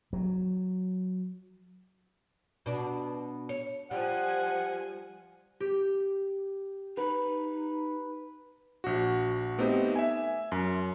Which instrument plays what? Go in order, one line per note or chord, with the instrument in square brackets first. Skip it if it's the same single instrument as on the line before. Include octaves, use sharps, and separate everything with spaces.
[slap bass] F#3
[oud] B2 D4
C#5
[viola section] F3 G#5 [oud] G3 [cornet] F#5
[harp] G4
[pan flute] D#4 [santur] B4
[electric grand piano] A#1 F#4
A3 B3 C4 D#4 G4
E5 G#5
F#2